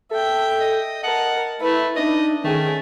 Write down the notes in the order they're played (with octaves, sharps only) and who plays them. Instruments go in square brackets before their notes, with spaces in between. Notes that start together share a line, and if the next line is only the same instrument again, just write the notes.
[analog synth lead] A4 [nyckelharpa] E5 G5
[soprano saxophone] D#5
[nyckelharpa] A#4 A5 [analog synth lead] D#5 [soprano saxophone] F#5
[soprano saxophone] A3 [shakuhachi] E4 [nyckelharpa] B4 [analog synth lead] E5
[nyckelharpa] D4 [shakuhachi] D#4 [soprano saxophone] D#5
[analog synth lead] D#3 [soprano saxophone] A3 [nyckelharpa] C#4 G#4 [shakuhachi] G5